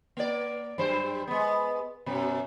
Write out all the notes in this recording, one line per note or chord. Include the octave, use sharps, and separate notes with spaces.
A#3 D5
G2 F#3 C5
G#3 B3
F#2 B2